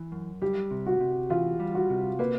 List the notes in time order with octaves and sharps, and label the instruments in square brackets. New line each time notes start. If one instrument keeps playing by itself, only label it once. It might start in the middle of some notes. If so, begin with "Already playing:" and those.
Already playing: [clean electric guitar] E3
F#2
[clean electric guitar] G3 [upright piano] G4
[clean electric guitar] C3
[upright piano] F#4
[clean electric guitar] C3
[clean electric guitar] E3 [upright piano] F4
[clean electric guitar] G3
[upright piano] F#4
[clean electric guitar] C3
[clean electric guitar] A#3 [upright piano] B4